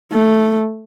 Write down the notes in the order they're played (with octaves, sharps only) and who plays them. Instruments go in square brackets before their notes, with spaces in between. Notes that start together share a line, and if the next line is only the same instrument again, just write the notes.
[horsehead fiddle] A3